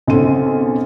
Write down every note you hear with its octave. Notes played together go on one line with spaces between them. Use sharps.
B1 C#3 C4 A4 C6 D#7